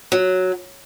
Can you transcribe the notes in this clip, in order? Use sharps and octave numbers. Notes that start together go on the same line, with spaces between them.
F#3